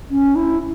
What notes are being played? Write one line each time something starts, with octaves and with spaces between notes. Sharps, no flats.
C#4
E4